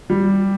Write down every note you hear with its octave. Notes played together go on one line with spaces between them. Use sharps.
G3